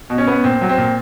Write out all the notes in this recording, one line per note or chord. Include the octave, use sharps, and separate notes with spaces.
B2
C#4
B3
A#2 C4
F#3
C4
A#2